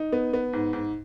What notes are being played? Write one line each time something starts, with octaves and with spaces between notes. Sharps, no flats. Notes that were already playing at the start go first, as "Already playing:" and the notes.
Already playing: D#4
B3
B3
G#2
G#2